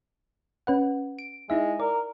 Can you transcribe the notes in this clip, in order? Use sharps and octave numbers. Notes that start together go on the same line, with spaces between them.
C#4 B4 F#5
D7
G#3 D#4 E4 E5
A#4 D5